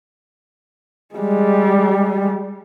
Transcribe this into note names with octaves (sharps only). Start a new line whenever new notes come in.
G3 G#3